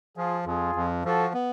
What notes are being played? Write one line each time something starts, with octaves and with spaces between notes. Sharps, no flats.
F3 F4 G#4
F2 F4 G#4
F2
F3 F#4 A4
B3